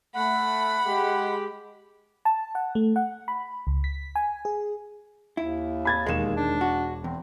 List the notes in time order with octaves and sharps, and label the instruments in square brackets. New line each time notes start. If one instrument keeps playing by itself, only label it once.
[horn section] A3 [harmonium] F#5 [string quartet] B5
[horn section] G#3 G4
[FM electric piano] A5
F#5
A3
F#5
B5
C#2
B6
G#5
G#4
[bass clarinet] D#2 [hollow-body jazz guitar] E4
[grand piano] B5 G#6 A6
[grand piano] E1 E7 [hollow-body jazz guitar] D#3 G#3
[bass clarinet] D4
[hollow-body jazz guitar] F#4
[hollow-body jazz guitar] E2 [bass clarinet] C4